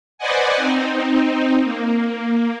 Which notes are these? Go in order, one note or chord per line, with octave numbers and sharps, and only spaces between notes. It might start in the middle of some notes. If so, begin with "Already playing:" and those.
B4 C5 D5 D#5 F#5 G#5
C4 D#4
A#3